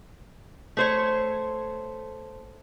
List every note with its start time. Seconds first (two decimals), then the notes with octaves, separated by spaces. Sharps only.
0.77 A3 C5 C#5